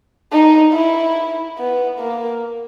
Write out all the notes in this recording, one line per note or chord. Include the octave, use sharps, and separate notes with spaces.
D#4
E4
B3
A#3